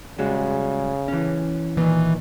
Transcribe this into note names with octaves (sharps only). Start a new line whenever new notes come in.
C#3 G3 G#3 F#4
E3 C#4
A#2 D#3 E3